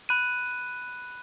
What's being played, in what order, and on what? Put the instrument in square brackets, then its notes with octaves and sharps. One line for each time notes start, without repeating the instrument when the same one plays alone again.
[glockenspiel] B5 F#6 D#7